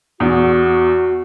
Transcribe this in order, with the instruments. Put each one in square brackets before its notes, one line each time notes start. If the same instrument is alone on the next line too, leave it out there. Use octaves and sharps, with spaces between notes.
[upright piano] E2 [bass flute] F#4